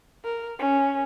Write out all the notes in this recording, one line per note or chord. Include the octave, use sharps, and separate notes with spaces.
A#4
C#4